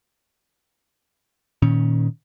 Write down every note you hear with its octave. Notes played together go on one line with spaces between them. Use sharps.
A#2 D#3 C#4